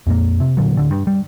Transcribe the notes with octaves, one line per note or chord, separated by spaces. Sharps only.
F2 A#2 A#3
C3
A#2 D3 F#3
D1 D3
G2
G3